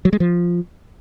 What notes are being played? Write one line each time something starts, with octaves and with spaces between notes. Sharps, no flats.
F#3
G#3
F3